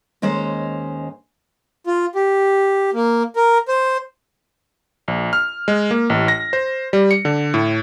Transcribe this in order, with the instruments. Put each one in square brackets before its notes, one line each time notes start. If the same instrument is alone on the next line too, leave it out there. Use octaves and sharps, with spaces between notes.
[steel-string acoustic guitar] D#2 G#3 C#4 C5
[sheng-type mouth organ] F4
G4
A#3
A#4
C5
[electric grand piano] A#1
F6
G#3
A#3
A1
A#6
C5
G3
C#7
D3
A2